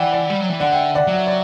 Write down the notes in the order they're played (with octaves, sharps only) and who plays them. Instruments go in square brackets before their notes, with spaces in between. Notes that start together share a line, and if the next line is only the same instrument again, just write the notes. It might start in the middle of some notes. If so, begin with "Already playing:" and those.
Already playing: [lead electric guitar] E3 [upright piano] D5 E5 F#5 G5
[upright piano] D5
[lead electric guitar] G3
F#3
E3
[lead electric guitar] D3 [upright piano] D5 F#5
[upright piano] E5 G5
D5 F#5
[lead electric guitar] F#3 [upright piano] F#5
[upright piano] E5
D5